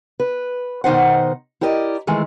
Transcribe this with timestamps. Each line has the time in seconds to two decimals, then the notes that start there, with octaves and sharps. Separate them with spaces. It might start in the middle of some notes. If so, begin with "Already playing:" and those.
0.20 B4
0.84 B2 D#3 D#4 C5 F#5
1.61 E4 G4 A#4 D5 D#5
2.07 D#3 E3 G#3 A3